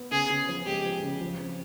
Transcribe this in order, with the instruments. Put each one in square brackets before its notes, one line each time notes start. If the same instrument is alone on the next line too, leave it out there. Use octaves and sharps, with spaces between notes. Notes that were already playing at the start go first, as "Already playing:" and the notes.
Already playing: [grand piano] B3
[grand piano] C#3 [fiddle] G#4
[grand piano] C#3
F3
[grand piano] G#3 [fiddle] G4
[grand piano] F3
C#3
F3
C4